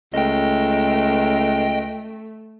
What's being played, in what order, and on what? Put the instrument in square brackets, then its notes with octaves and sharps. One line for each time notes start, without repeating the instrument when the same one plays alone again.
[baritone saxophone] C#2 [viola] A3 [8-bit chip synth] D#5 G5